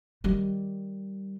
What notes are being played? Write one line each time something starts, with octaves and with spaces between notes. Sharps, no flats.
D#3 G3